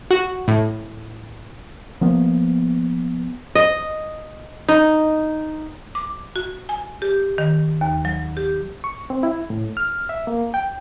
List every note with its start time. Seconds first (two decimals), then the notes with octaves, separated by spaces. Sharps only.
0.11 F#4
0.48 A2
2.01 F3 A#3 B3
3.55 D#5
4.68 D#4
5.95 D6
6.36 F#4
6.69 G#5
7.02 G4
7.38 D#3
7.81 D#2
8.05 F#3
8.37 G4
8.84 C#6
9.10 C4
9.23 E4
9.50 A2
9.77 F6
10.09 E5
10.27 A#3
10.54 G5